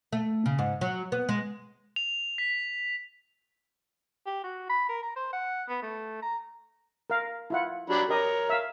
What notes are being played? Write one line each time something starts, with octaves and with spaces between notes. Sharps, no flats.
A3
C#3
G#2
F#3
B3
G#3
F7
B6
G4
F#4
B5
A#4
A#5
C5
F#5
B3
A3
A#5
A#4 F5
E4 F4 F#5
F#3 D4 G4 B5
G4 A#4 C#5 D#5
E5 F5